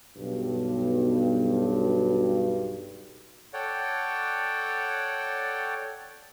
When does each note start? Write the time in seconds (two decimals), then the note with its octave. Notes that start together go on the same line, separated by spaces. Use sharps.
0.17 B1 G2
3.54 A4 C#5 D5 F#5 G5